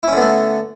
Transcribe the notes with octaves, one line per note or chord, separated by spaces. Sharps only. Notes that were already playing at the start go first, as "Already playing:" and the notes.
D3 A3 B3 C#4 E4